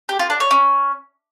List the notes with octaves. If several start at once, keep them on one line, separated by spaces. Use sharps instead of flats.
G4
F4
D4
C#5
C#4